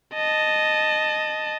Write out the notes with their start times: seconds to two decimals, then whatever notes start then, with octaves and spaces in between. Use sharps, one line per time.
0.14 D#5 A5